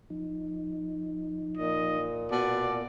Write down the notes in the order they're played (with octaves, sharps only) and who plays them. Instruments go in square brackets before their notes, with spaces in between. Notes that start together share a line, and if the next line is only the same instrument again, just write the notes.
[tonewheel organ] F3 D#4
[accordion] A#2 [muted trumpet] D#5
[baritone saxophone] B2 [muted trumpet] D5